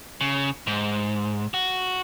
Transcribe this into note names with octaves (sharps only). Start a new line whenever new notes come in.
C#3
G#2
F#4